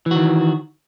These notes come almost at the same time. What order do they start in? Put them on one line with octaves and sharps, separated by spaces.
E3 F#4 D#3